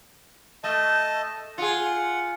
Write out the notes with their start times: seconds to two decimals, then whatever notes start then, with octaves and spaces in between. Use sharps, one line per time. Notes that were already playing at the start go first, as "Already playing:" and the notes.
0.64 A3 D#5 A5
1.58 F4 G#4 F#5